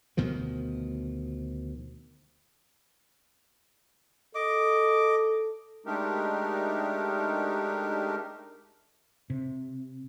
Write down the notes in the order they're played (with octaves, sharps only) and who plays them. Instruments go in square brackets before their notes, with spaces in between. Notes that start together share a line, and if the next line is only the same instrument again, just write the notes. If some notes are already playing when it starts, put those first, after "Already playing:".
[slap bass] D2 B2 D#3 F3
[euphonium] A4 [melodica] D#5 D6
[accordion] G#3 A3 D4 D#4 G4 A#4
[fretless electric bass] C3